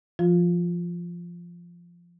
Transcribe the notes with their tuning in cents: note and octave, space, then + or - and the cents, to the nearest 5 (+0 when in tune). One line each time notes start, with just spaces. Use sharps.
F3 -15 F4 +15